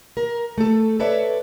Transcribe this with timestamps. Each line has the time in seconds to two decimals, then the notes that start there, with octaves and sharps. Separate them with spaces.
0.17 A#4
0.58 A3 A4
1.00 A4 B4 C#5 D5 E5